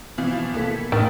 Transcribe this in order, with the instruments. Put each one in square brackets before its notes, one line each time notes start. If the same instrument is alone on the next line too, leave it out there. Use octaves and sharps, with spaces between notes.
[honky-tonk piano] B2 E3 F3
[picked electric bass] B1 A#3 B3 [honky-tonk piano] E3 A4 B6
[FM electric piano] A2 [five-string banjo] D#3 [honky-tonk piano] A6